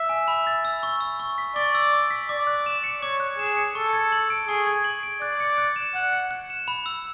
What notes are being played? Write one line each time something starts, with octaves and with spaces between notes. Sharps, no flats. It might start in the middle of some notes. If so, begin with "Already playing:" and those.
Already playing: E5
G#5
B5
A6
E6
C#6
E6
C#6
B6
D5 C#6
E6
C#6
B6
D5 D6
F#6
E7
C#7
C#5 D6
F#6
G#4 E7
C#7
A4 C#6
G#6
F#7
D7
G#4 C#6
G#6
F#7
D7
D5 F#6
C#7
F#6
E7
F#5 F#6
C#7
F#6
E7
B5
E6